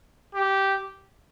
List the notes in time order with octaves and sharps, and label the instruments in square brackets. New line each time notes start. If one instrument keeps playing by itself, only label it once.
[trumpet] G4